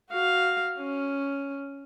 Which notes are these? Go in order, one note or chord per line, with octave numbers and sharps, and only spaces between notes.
F#4 F5
C#4